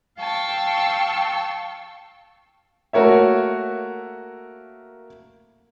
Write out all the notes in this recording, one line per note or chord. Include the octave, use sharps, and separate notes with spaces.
F5 G5 A5 C#6 E6
A3 A#3 F#4 A#4 C#5 E5